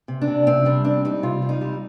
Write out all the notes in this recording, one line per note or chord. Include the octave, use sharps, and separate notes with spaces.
C3
D4
C3
C3 C4
G3 D4
C4 D4
G3 D#4
C3 F4
G3
D#4
G3